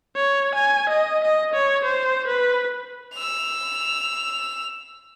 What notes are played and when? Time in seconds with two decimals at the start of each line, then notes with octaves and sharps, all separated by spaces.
0.16 C#5
0.55 G#5
0.90 D#5
1.24 D#5
1.54 C#5
1.85 C5
2.28 B4
3.14 E6 F7